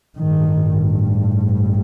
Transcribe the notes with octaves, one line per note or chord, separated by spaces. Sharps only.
A1 G2 D#3